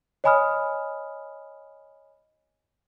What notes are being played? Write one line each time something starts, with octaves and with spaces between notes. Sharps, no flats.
C#5 D#5 G#5 B5 D#6 F6